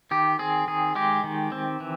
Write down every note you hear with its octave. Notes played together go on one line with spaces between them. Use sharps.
D#3 G4
C4 G#4
D#3 G#4
G#3 G4
D#3
C4
E3